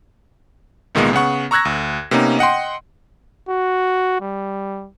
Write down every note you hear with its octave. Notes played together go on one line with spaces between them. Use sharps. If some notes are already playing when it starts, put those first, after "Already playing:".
C2 A#2 D#3 G#3 A#3 B3
C#3 B3 F#5 C#6
A#5 C#6 E6 F#6 G#6 A#6
D2
C3 A#3 B3 C#4 D#4
D#5 F#5 G5 C6
F#4
G3